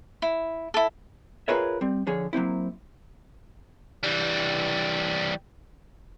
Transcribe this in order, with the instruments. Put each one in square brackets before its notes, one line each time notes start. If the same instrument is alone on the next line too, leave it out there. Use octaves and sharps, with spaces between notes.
[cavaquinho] E4
E4 A4
[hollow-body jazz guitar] F4 G#4 A#4 B4 C#5 E5
G3 C4
D3 F3 G#4 C#5
F#3 A#3 C4 E4
[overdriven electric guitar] E3 G3